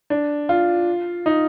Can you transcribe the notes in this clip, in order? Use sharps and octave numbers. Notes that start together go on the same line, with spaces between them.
D4
F4
D#4